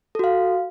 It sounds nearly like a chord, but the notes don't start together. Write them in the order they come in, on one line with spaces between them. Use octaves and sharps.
A4 F#4 F5